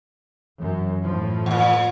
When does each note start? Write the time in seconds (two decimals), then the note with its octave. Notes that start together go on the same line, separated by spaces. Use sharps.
0.60 F#2 E3
1.04 A2 F3
1.46 E2 A#2